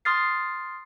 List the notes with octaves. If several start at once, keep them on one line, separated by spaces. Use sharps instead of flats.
C6 D#6 F6 A6 C7